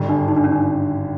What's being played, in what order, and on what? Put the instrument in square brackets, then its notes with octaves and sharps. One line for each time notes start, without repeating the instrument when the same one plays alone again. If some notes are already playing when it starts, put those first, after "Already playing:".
Already playing: [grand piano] G#1 G2 D3
[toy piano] D4
D#4
D4
C#4
D4